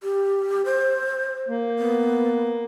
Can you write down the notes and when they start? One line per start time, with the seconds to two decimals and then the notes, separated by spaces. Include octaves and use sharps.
0.03 G4
0.65 C5
1.48 A#3
1.79 B3